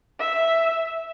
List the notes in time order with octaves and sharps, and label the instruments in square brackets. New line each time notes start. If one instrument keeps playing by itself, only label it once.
[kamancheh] E5